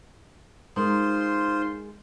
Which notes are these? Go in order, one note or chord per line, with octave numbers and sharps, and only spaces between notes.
G#3 D#4 F4 A#4 C5 C6